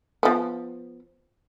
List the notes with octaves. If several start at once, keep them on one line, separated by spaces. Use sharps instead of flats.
F3 B3